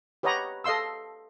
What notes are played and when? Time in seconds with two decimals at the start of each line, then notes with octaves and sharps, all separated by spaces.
0.23 G4 B4 C#5 D#5 F#5 A#5
0.64 A4 D#5 F5 C6 E6